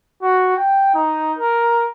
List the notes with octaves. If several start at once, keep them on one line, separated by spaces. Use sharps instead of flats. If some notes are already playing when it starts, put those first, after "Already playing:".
F#4
G5
D#4
A#4